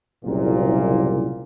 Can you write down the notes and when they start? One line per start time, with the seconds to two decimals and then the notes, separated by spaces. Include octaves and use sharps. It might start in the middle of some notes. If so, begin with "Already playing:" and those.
0.24 F#1 C2 A#2